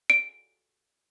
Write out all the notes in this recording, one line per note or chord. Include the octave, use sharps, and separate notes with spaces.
D7